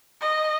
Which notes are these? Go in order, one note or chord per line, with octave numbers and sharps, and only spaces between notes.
D#5